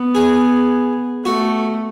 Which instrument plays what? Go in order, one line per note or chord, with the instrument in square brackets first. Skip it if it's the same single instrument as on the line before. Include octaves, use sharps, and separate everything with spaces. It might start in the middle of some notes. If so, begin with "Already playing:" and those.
Already playing: [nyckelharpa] B3
[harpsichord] G#4
[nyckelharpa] A3 [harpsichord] F#4